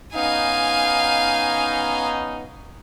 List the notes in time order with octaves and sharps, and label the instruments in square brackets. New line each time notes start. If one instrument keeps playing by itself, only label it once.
[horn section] B3 C#4 D#4 [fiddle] F5 G#5